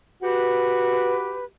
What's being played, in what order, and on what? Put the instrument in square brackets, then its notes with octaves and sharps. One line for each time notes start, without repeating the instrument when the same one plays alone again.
[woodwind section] F#4 G4 B4